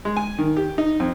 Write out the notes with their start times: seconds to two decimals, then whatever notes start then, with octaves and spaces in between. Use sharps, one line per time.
0.05 G#3
0.17 G#5
0.38 D#3
0.57 G4
0.78 D#4
1.00 F2